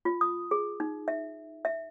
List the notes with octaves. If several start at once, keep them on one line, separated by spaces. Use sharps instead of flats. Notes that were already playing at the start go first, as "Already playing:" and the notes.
F4
D#6
G#4
D#4
E5
E5